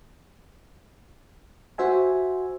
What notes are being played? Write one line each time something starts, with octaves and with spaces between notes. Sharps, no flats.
F#4 C5 E5 G#5